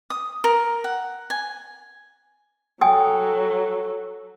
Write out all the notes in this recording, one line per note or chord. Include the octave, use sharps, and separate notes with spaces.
D#6
A#4
F#5
G#5
F#3 A4 G5 G#5 D#6